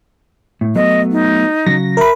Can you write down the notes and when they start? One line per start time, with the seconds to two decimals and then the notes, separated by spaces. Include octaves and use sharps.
0.61 A2
0.76 F#3 A3 B3 D#5
1.12 D#4
1.66 C#3 F#3 A#6
1.97 A#4 E5 B5